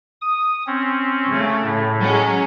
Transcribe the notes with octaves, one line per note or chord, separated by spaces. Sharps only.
D#6
C4 C#4
C#3 A3
A2
F#3 G#3 C#4